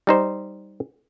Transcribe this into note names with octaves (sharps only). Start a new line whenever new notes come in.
G3 D#4 C5